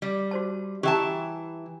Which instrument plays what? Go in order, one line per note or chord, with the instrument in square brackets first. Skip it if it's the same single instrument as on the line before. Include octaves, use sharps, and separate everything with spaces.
[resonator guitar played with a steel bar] G3
[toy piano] F#4 C5 A5
[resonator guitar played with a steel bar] E3 E5 A5 [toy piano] G4 G5 A#5